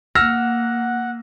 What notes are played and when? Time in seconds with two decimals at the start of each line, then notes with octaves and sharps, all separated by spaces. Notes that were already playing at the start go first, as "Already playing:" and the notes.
0.15 A#3 F#5 E6 F6 A#6